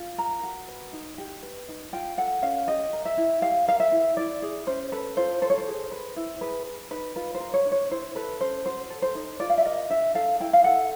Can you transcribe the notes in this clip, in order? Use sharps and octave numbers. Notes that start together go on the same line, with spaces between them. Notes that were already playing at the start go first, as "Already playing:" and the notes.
Already playing: F4
A#4 A#5
F#4
B4
D#4
G4
B4
D#4
F4 G5
A4 F#5
C#4 F5
G4 D#5
A#4
E5
E4
G4 F5
A#4 F5
E5
E4
E4 D5
G#4
C#4 C5
A4 B4
F4 C5
A4 C5
C#5
C5
G#4
B4
E4
G#4 B4
B4
D#4 B4
F4 B4
C5
A#4
C#5
D4
C#5
E4 C5
A4 B4
C#4 C5
F#4 C5
A4
C5
D#4
F4 D5
F5
E5
A#4 D#5
D4 E5
A4 F5
E4 G5
F5
A4 F#5